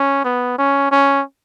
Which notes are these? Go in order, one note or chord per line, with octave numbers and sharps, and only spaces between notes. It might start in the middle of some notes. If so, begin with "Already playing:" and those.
Already playing: C#4
B3
C#4
C#4